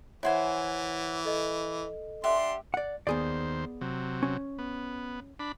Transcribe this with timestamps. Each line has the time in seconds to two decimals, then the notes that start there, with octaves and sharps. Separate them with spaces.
0.23 E3 E4 C5 C#5 F#5 G#5
1.25 A4 D#5
2.24 D4 G4 E5 F#5 C6
2.74 D5 F#5
3.07 D#2 B3 G#4 C5 D5
3.81 C3 F#3
4.23 C#4
4.59 B3
5.39 D4 B5